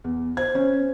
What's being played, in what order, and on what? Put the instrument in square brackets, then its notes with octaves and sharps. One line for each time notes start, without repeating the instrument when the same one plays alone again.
[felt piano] E2
[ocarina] C5 [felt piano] G#6
[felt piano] C#4